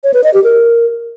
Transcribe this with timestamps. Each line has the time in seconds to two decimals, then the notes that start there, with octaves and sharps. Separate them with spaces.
0.04 C#5
0.14 B4
0.24 D#5
0.34 G4
0.44 A#4